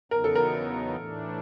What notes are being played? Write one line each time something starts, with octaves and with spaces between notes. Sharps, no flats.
E2 C#3 F#3 B3 D#4 A#4
A4
A#4
A2 E3 A3 D4